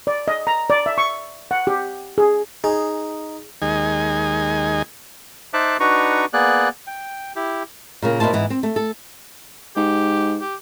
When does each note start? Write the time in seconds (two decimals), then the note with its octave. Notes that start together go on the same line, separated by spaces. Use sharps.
0.07 D5
0.28 D#5
0.47 A#5
0.70 D5
0.86 E5
0.98 C#6
1.51 F#5
1.67 G4
2.18 G#4
2.64 D#4 G#4
3.62 D#2 G#3 D#4 G#5
5.53 D#4 C5 E5 A5 D6 F#6
5.80 D4 D#4 F#4 B4 A#5 C#6
6.33 A#3 B3 G#4 D5 F#6
6.87 G5
7.36 E4 G4
8.02 A#2 C#3 A#3
8.20 D2 B2 A#3 E4 C5 A5
8.33 G#2 E3 B3
8.50 C4
8.63 A3
8.76 A4
9.76 G#2 G4
10.41 G4